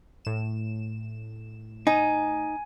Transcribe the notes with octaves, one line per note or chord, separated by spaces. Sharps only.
A2 E7
D#4 G#5